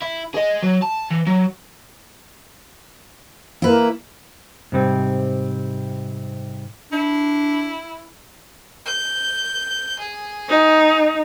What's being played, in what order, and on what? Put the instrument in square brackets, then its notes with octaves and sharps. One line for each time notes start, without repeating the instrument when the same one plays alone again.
[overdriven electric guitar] E4
G#4 D#5
F#3
A5
E3
F#3
[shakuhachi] A#3 [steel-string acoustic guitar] E4 B4
[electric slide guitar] G#2 C3 G3 C4
[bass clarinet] D4 [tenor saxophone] E4
[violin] G6
G#4
[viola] D#4